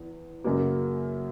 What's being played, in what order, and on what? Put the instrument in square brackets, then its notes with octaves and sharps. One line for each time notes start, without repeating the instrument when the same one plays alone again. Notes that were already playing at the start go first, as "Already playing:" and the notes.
Already playing: [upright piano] E2
F#2 C#3 F#3 A#3